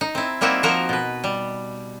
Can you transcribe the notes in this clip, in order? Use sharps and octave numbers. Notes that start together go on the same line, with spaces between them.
D#4
C4 E4
G3 A#3 C4 D#4 E4 F#4
F3 F#4 A#4 C5
B2 B4
G3